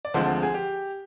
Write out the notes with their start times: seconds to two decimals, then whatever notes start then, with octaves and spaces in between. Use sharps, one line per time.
0.05 D5
0.14 D2 D3 F3 G#3 C4 C5
0.43 G#4
0.54 G4